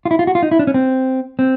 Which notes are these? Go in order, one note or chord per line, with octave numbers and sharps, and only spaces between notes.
F4
E4
F4
F#4
F4
D#4
E4
D4
C#4
C4
C4